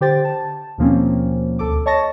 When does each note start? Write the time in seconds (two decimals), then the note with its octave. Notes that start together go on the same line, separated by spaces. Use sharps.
0.01 D3 G4 C5 G5 A6
0.25 A5
0.78 D#2 B2 F3 A#3 C4 C#4
1.59 D2 A4 D6
1.86 C#5 D#5 A5 C#6 A6 A#6